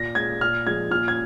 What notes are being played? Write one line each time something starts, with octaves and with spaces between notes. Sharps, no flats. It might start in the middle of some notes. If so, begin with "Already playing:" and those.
Already playing: A#2 A#6
G#3 G#6
A#2 F6
F3 G#3 G#6
A#2 F6
G#6